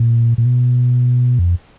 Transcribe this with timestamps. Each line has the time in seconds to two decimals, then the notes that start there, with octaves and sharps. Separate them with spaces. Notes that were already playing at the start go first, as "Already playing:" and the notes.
Already playing: A#2
0.38 A#2
0.45 B2
1.39 F2